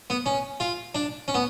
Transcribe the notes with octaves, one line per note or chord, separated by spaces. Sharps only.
B3
C#4
F4
D4
C#4
B3